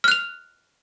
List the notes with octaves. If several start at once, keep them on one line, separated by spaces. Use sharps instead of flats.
F6 F#6 F7